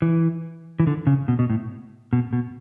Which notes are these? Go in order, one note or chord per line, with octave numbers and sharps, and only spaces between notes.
E3
E3
D3
C#3
B2
B2
A2
B2
B2